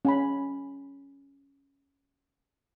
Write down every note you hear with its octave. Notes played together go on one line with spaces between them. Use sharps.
C#4 G#5 B5